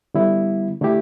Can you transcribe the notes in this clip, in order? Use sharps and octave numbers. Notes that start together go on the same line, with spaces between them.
D3 G3 B3 E4
D3 A3 E4 G4